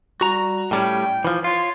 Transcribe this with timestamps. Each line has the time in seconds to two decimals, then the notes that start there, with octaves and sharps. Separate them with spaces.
0.21 G3 F#4 A#5
0.71 A2 G3 C#4 G5
1.25 E3 F3
1.44 F4 B4 C#5 C6